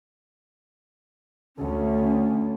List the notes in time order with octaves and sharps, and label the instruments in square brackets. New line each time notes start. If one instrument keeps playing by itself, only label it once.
[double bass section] D2 [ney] C#4